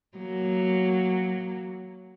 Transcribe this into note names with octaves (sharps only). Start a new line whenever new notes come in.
F#3 A#3